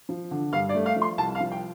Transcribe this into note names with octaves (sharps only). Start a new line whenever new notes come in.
F3
D3
G2 F5
D5
A3
F5
F3
C6
C2 A5
F5
F3
G5